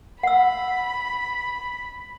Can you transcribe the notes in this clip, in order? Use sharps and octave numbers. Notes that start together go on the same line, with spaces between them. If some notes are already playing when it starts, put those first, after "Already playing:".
F#5 B5 E6